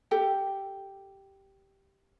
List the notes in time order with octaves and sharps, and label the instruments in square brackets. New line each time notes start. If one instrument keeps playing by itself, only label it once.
[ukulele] G4 A4 G5